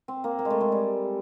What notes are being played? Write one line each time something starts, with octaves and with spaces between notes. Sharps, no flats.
C4
A#3
A#3
G#3
A3
G#3
G3